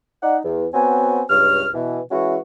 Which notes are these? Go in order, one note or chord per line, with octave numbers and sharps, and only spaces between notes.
D#4 D5 F#5
E2
B3 C4 F#4 C#5 G#5
C#2 G2 C#5 F6
B2 E3
E3 G#3 C#4 E4 F#4